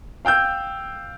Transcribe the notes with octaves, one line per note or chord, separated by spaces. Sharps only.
F5 G5 E6 G6